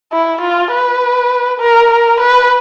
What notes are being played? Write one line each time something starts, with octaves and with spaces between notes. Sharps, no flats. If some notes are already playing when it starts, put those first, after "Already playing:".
E4
F4
B4
A#4
A#4
B4